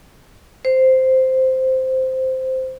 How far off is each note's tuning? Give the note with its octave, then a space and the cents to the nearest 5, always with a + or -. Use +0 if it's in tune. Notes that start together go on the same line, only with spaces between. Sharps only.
C5 -5